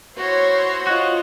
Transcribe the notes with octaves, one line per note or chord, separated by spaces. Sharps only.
E4 F#4 C5 C#5 C6
F4 F#4 D#5